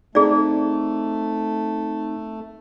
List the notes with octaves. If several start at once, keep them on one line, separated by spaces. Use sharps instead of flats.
A3 C4 D#4 G#4 D5